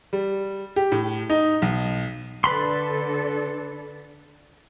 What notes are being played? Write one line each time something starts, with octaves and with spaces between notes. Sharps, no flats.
G3
G4
A2
D#4
B1
D3 D4 A4 B4 B5 C6